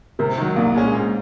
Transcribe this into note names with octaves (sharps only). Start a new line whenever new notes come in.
C3 A#4
D#3 F#3
C2 A#3
A#2 G#3 C#4
G#2